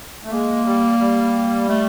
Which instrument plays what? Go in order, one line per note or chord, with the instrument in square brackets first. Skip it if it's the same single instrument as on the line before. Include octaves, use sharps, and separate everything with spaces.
[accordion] A3
[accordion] G#3 [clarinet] A#3
[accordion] G3
G3
[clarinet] A3